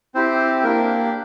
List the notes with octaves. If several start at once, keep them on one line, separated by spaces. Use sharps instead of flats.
C4 E4 G4 C5
A#3 D4 G4 A#4